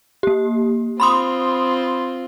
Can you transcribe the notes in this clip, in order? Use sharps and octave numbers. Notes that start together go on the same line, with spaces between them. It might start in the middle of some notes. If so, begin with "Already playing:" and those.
A#3 G4
C4 F4 B5 C6 D#6